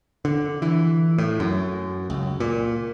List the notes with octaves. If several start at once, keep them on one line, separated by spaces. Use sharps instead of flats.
D3
E3
A2
F#2
C#2
A#2